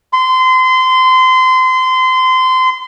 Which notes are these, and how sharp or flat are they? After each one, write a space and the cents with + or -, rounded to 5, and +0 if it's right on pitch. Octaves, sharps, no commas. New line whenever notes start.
C6 -25